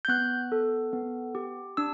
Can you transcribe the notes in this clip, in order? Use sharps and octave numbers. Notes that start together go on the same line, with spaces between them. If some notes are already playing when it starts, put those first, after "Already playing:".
G6
B3 F#6
A4
B3
G4
D4 E6